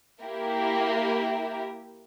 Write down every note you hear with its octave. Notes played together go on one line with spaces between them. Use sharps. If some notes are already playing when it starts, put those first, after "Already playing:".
A#3 E4 G4 A#4